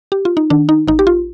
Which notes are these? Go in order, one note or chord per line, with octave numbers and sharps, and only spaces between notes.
G4
F4
D#4
D#3 D4
D#4
A1 D#4
G4
F4